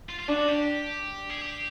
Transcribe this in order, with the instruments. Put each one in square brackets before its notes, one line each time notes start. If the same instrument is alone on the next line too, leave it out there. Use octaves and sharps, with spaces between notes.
[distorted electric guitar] F4
F4
[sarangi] D4 [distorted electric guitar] F#4
[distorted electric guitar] G4
G#4
G4